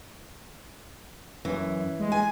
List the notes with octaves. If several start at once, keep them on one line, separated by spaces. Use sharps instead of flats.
F#2 E3
G#3
G#5